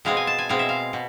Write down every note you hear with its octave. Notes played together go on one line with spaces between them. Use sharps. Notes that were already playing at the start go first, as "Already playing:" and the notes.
B2 G#3 C4 F5
G#5
A5
G#5
B2 G#3 C4 F5
E5
F5
B2